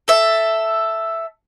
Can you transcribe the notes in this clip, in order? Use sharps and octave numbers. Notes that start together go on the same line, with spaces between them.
A4 E5